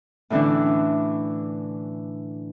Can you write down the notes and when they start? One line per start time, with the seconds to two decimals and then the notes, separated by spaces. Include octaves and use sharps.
0.30 A2 D3 E3 C#4 D4